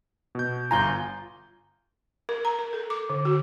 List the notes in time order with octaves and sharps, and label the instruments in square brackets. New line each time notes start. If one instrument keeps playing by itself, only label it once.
[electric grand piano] B2 G6
[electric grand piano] G1 F4 G#5 [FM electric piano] A#5 G6
[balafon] A#4
A#5
A#4
A4
D6
D3
F#4